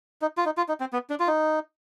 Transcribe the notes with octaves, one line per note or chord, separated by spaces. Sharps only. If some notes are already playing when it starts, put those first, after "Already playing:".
D#4
F4
D#4
F4
D#4
C4
B3
D4
F4
D#4